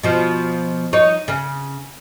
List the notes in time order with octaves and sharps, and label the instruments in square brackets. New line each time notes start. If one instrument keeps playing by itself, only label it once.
[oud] B2 F3
D#4 C#5
C#3